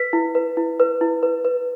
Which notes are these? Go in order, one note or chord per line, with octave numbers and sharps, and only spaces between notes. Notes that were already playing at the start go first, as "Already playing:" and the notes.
Already playing: B4 B6
E4
B4
E4
B4
E4
B4
B4